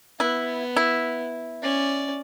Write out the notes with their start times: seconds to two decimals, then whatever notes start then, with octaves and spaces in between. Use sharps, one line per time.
0.20 B3 E4
0.76 E4
1.63 C#4 D5